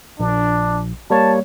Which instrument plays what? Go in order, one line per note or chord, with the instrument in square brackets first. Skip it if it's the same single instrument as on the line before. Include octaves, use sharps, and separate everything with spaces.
[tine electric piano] A#1 [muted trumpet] D4
[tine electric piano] G3 A#3 C#5 [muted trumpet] A5